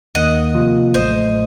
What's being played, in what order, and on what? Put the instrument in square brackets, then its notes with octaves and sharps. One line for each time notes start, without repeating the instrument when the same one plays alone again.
[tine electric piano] D#2 D#3 A#3 [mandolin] D#5 F#5
[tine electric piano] C3 F3 A#3 F4
[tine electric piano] A1 A2 F#3 A3 [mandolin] C5 D#5